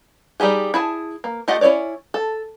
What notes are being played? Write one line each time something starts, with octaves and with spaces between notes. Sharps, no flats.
G3 D#4 G4 G#4
E4 G#4 A5
A#3
A3 F4 G4 D#5 F#5
C#4 E4 A#4 C#5 D5
A4